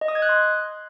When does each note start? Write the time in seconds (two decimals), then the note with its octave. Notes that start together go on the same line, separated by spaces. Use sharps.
0.01 D#5
0.08 D#6
0.15 G#6
0.22 F#6
0.29 C6